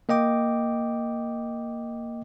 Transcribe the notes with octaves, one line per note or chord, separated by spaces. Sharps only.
A#3 D#5 G5 D6